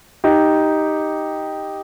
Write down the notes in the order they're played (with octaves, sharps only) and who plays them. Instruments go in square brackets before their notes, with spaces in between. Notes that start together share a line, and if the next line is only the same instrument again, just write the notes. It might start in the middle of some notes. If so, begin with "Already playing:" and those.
[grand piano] D#4 G4